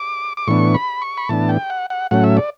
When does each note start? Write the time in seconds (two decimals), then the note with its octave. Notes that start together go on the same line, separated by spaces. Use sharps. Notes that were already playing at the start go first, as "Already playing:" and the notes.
Already playing: D6
0.37 D6
0.47 A2 E3 B3 D4 C#6
0.74 B5
1.02 C#6
1.17 B5
1.29 A2 E3 B3 D4 A5
1.49 G5
1.70 F#5
1.90 F#5
2.11 A2 F#3 A3 C#4 F#5
2.24 E5
2.37 D5